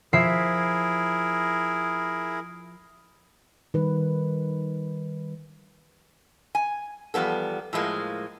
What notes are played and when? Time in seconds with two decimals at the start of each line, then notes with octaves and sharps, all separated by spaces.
0.13 F3 E4 G#4 A#4 E5 C7
3.74 D#3 G3 B4
6.55 G#5
7.14 E2 F3 G3 B3 A4
7.73 A2 F3 G#3 A#3